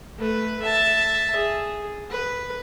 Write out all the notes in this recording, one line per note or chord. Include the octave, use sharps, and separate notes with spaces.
A3 B4
E5 A5
G#4
B4